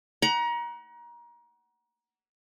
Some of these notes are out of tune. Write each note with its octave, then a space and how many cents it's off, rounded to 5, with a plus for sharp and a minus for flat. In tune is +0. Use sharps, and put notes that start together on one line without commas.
F#5 +25 A#5 +30